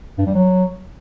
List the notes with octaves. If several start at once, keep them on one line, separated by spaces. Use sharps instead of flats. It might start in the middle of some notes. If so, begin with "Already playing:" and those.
G2
G3
F#3